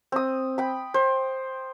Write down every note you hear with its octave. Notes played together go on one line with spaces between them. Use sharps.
C4 D#6
G5 B5
C5